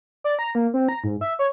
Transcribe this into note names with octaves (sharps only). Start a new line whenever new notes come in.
D5
A#5
A#3
C4
A#5
G#2
E5
C#5